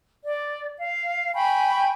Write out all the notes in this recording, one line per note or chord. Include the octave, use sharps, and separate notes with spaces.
D5
F5
G5 G#5 B5 C#6